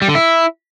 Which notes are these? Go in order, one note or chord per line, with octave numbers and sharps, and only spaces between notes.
G3
D3
E4